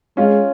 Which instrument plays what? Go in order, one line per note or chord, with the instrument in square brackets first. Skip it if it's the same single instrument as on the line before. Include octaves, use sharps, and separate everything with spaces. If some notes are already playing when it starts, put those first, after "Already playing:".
[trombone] G#3 [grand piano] C#4 F4